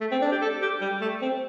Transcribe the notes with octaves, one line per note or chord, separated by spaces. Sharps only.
A3
C4
D4
G4
A4
G4
G3
A3
C4